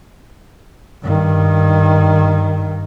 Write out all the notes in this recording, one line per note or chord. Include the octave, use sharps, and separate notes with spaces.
G2 D#3